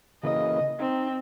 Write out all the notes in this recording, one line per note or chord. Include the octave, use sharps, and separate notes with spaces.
C#3 E3 A#3 D#5
C4 D#4